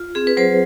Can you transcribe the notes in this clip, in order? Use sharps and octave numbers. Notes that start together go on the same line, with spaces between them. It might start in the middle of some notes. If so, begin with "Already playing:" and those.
Already playing: F4
C4 G#4
B4
F#3 C5